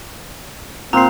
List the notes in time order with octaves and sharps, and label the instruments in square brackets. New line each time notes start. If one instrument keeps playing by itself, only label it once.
[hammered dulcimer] A#2 [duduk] C4 [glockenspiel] A#5 C7